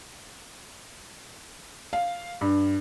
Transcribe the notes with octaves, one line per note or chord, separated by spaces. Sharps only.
F5
G2